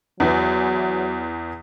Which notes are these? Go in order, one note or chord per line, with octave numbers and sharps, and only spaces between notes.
E2 E3 F#3